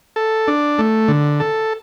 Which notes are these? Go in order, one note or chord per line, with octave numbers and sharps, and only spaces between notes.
A4
D4
A3
D3
A4